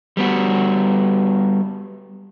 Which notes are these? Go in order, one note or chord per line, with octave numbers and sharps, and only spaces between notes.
G3 B3 F#4